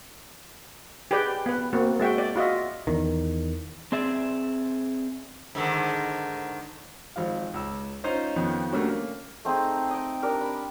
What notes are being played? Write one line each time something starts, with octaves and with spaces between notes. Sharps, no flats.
G4 G#4 B4 D5 G5
B3 B4
A#3 C4 F#4
G#3 F#4 E5 G5
D5
F4 F#4 D#5 E5
E2 D#3
C4 G#4 D5 E5
G#2 D3 D#3
G#1 F3 F5
C#2 E6
C#4 D#4 F4 C5 C#5 D#5
F2 D#3 B3
G3 A3 A#3 C#4 D4 F#4
A#3
A3 C4 D#4 G#4
D#5 G5
D4 G4 A#4
B5